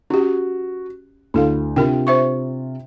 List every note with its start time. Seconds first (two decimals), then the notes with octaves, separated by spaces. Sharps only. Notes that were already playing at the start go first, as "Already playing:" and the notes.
0.10 C#4 F#4 G4
1.34 D2 E4 A4 F5
1.76 C3 D4 F4 A#4 G5
2.07 C5 E5 C#6